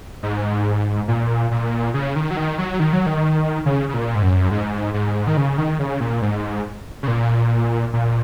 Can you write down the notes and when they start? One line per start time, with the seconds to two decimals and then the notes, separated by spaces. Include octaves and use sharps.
0.23 G#2
1.08 A#2
1.51 A#2
1.94 C#3
2.16 D#3
2.31 F#3
2.37 D#3
2.58 F#3
2.80 D#3
2.93 F#3
3.06 D#3
3.66 C#3
3.89 C#3
3.94 A#2
4.15 G#2
4.22 F#2
4.51 G#2
4.94 G#2
5.27 D#3
5.37 C#3
5.58 D#3
5.79 C#3
6.00 A#2
6.22 G#2
7.03 C#3
7.08 A#2
7.93 A#2